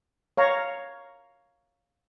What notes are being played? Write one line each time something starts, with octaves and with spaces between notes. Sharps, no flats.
C#5 F5 A#5